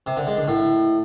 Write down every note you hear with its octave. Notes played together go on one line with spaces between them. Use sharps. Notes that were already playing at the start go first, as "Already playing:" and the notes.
C3
D3
G#3
D3
A2